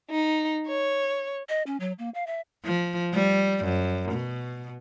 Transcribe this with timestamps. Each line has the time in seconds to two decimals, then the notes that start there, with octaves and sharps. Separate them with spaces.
0.11 D#4
0.68 C#5
1.49 D#5
1.67 C#4
1.80 F#3
1.99 A#3
2.14 F5
2.27 E5
2.65 F3
3.14 G3
3.64 F#2
4.12 B2